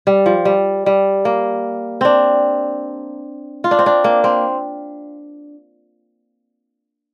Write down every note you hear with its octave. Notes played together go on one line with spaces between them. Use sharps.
G3
F3
G3
G3
A#3
C4 D4
F4
D4
C4
D4
A#3
C4